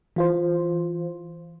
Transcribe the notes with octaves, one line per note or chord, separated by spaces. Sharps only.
E3 F4 C5